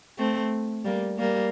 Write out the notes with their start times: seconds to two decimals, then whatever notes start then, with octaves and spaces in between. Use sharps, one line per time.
0.18 A3 C4
0.85 G3 A#3
1.19 G3 A#3